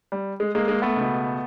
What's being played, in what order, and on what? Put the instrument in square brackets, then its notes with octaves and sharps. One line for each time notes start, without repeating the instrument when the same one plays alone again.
[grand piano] G3
G#3
G#3 A#3
G#3 A#3
A3 B3
C#2 B2